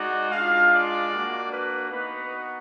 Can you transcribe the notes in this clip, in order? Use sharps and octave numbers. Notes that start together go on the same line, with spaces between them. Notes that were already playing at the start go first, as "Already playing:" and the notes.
Already playing: G#3 D#4 F#4 D5
G#3 D4 F4 F5
D5
A#3 D4 F#4
B4
B3 D#4 F#4 B4